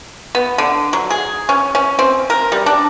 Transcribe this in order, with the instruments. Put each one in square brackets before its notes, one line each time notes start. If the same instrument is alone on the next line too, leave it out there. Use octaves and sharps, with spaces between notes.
[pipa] B3
D3
F#3
G#4
C#4
C#4
C4
A#4
G3
D4